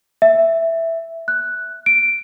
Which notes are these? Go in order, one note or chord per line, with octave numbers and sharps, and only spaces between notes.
E5
F#6
D7